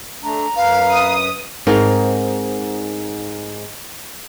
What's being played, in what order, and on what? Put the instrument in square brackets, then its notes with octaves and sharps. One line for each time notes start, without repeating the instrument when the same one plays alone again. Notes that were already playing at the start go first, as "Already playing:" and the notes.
[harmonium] A3 D4 [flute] A#5
[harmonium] F#2 B4 [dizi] F5
[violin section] D#6
[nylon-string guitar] G#2 C4 D#4 A#4